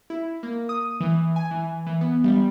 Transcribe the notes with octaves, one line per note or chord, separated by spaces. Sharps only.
E4
A#3
D#6
E3
G#5
E3
E3
B3
G3